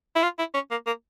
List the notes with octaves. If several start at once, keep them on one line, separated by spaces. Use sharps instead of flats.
E4
F4
E4
C#4
A#3
A#3